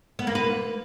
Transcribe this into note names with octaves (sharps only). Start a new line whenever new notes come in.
B3
A#3
B4